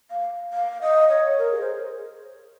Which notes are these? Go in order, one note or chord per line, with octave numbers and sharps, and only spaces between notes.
F5
F5
D#5
C#5
A#4
G#4
C5